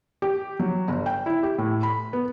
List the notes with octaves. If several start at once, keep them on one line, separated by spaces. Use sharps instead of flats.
G4
F#3
G1
G5
E4
G4
A2
B5
B3